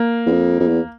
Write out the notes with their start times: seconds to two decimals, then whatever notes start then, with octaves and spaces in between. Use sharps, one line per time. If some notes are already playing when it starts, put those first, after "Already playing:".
Already playing: A#3
0.26 E2
0.32 F2
0.60 F2
0.68 E2